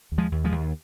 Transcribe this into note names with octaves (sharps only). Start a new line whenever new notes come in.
D#2
F3 G#3
D#2
F3 G#3
D#2